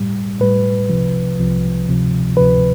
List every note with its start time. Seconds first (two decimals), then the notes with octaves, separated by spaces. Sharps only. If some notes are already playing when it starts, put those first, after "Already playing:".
Already playing: A2 G3
0.40 A2 G3 B4
0.90 C2 C3 F3
1.39 C2 C3 F3
1.88 D2 C3 F3
2.37 D2 C3 F3 B4